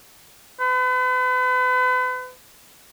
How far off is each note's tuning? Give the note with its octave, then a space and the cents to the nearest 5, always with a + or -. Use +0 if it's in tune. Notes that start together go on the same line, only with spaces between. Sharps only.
B4 +40